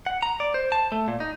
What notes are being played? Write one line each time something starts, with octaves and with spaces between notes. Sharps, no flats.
F#5
A#5
D5
C5
A5
A3
A#2
D#4